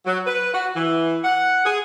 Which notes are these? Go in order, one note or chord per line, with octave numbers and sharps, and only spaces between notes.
F#3
B4
F#4
E3
F#5
G#4